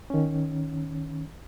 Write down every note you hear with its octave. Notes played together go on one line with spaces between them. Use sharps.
D#3 C#4